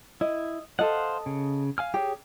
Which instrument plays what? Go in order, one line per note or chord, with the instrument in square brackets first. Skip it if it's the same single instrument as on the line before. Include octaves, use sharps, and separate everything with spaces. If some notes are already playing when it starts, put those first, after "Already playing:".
[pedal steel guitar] E4 [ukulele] D#5
[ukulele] A4 D#5 [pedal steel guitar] C5 F5 F#5
[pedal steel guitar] C#3
F5 G#5 F6
[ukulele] G4 [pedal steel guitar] G#4 C#5